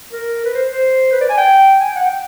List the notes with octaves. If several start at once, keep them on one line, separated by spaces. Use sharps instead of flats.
A#4
B4
C5
C5
B4
D5
G#5
G5
G#5
G5
F#5
G5